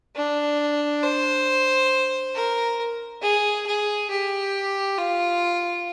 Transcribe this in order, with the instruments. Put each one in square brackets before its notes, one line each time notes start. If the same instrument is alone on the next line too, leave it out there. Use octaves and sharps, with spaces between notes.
[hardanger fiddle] D4
C5
A#4
G#4
G#4
G4
F4